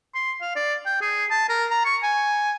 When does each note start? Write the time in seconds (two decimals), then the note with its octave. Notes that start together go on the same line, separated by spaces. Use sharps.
0.15 C6
0.42 F5
0.55 D5
0.86 G5
1.01 G#4
1.30 A5
1.49 A#4
1.71 A#5
1.85 C#6
2.03 G#5